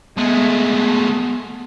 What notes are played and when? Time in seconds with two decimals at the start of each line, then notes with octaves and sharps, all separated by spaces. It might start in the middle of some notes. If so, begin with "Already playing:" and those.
0.18 G#3 A3 B3